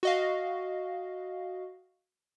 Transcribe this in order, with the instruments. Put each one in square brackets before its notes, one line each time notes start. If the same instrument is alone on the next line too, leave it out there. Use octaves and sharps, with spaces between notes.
[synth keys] F#4 D#5 F5